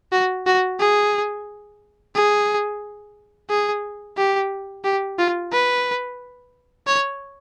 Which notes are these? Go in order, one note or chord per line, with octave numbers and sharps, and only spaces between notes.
F#4
F#4
G#4
G#4
G#4
G4
G4
F4
B4
C#5